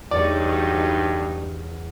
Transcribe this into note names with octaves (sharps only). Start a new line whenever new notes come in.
E2 G2 F#3 A3 D#4 C#5 D5